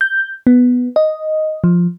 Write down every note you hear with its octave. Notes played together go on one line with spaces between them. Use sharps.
G6
B3
D#5
F3